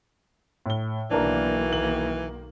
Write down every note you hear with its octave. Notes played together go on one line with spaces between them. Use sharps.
A2 G7
B1 D#3 E3 A#3 D4 A#4
F#7